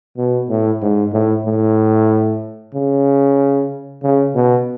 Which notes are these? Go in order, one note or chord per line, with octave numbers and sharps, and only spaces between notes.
B2
A2
G#2
A2
A2
C#3
C#3
B2